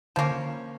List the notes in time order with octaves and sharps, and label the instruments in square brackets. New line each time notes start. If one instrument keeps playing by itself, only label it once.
[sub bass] D3 [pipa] F3 A#3 C#4